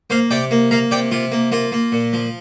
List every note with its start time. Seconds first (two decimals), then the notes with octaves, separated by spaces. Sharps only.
0.10 A#3 C5 F5
0.31 C3 D5 G5
0.51 A#3
0.71 A#3 F5 A#5
0.91 C3 D5 G5
1.11 C3 F4
1.32 A#3
1.52 A#3 F4
1.72 A#3
1.92 A#2
2.13 F3